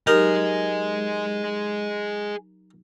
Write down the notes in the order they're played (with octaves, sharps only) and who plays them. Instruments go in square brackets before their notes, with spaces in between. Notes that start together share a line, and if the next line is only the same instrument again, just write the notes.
[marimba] F#3 D#4 G4 [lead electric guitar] G#4 D#5 [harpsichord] A#4